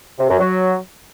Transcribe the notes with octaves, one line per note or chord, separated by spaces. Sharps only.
C3
F#2
F#3